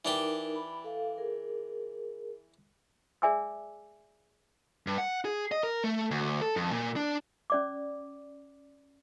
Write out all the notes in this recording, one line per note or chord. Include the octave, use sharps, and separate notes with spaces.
E3 D4 D#4 G4 A#4
B5
A4 F5
G#4 A#4
G#4 D5 E5 G#5 D6 E6
G2
F#5
G#4
D#5
A#4
A3
D2
A4
F2
A#2
D4
C#4 D5 D6